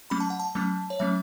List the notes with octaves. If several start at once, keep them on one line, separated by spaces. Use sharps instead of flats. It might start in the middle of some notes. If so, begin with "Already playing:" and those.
F#3 A3 C#4 B5
A5
F#5
A5
F#3 A3 C#4
C#5
F#3 A3 C#4 E5